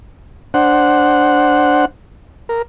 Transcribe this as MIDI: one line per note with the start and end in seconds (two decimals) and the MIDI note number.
0.54 1.85 62
0.54 1.85 72
0.54 1.85 78
2.49 2.62 70